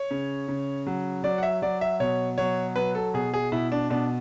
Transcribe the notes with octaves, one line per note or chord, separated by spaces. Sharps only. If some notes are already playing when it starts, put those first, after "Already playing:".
Already playing: C#5
C#3
C#3
F#3
F#3 D5
F#5
E5
F#3 D5
E5
B2 C#5
F#3 C#5
F#3 B4
A4
B2 G#4
G#4
B2 E4
D4
B2 D4